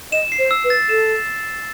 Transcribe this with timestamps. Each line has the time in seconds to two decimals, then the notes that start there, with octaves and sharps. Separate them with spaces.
0.12 D#5 E7
0.32 C7
0.39 C5
0.51 E6
0.64 B4
0.70 A6
0.89 A4 E7